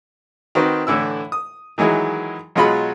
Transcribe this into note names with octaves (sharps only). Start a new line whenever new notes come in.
D#3 C4 F#4 B4
A2 D3 E3 E4 E6
D#6
D#3 E3 F#3 G#3 E4
B2 F#3 G#3 F4 F#5 B5